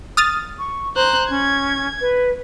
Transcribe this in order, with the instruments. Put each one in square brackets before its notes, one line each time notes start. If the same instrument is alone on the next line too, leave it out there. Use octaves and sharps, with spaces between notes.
[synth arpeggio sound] D#6 F6 A6
[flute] C#6
[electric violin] C5 F#6 [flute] A#5
[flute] C#4 [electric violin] G#6
[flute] B4